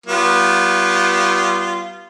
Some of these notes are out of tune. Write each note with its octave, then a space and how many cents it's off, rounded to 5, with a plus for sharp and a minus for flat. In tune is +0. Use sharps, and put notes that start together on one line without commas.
G3 -35 B3 -20 F4 -15